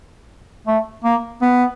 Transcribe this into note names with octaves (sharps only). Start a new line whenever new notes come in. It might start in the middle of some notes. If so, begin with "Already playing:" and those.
A3
A#3
B3